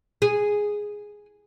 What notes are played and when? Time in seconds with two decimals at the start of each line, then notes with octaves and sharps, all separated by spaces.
0.22 G#4